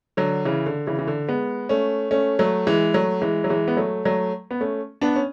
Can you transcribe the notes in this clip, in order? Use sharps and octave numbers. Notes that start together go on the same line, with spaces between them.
D3 F#3
C#3 E3
D3
C#3 E3
E3
D3
G#3 B3
A3 C#4
A3 C#4
F#3 A3
E3 G#3
F#3 A3
E3 G#3
F#3
E3 G#3
B3
F#3 A3
F#3 A3
B3
A3 C#4
B3 D4
C#4